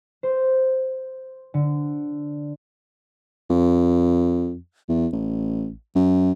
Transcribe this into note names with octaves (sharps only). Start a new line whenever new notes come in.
C5
D3
F2
E2
A1
F#2